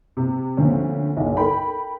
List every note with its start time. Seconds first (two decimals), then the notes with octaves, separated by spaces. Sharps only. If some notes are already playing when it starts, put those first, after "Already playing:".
0.17 C3
0.57 D2 A#2 D3 F3 C4 C#4
1.17 F#1 B1
1.37 A4 A#4 G5 B5